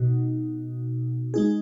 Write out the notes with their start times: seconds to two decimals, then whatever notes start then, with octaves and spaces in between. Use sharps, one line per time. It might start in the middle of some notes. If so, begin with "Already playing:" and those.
Already playing: B2 D#4 F#4
1.34 G#3 D#4 G#4